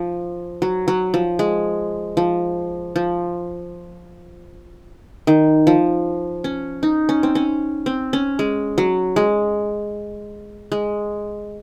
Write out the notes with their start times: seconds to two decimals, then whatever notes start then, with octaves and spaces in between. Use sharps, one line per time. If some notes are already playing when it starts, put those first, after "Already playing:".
Already playing: F3
0.62 F#3
0.88 F#3
1.14 F3
1.39 G#3
2.17 F3
2.96 F3
5.27 D#3
5.67 F3
6.44 C#4
6.83 D#4
7.09 C#4
7.23 C4
7.35 C#4
7.86 C4
8.13 C#4
8.39 G#3
8.78 F#3
9.16 G#3
10.72 G#3